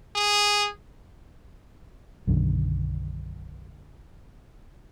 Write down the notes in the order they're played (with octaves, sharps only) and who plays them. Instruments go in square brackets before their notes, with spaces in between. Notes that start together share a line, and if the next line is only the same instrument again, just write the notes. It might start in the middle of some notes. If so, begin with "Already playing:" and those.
[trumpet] G#4
[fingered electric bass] B1 F#2 D3 D#3